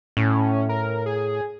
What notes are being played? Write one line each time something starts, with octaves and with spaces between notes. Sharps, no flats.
A2 C#4
A#4
G#4